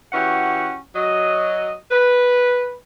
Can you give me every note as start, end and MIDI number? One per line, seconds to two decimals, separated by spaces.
0.13 0.75 52
0.13 0.75 61
0.13 0.75 66
0.13 0.75 67
0.13 0.75 78
0.95 1.73 54
0.95 1.73 75
1.91 2.73 71